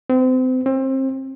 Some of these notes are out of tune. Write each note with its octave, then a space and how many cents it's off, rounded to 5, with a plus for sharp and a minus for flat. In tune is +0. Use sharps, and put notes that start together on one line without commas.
C4 -30
C4 +30